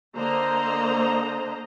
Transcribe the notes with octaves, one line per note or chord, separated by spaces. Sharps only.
D3 A#3 C5 D#5 A#5